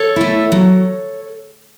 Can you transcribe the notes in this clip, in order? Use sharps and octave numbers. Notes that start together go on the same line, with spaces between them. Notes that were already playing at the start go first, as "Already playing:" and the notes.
Already playing: A4 C#5
A3 E4
F#3